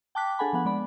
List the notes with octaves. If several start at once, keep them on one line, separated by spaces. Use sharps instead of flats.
G5 A5 D6 F#6 B6
D4 G#4 A4 F#5 G#5 B5
F3 B3 F#5
G#3 B3 D5 B5